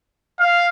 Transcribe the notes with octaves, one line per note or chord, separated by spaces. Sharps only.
F5